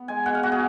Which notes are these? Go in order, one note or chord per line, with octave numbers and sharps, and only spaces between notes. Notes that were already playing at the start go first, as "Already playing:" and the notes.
Already playing: B3
G#3 G#5
B2 F#5
F5
B2 F#4
G#4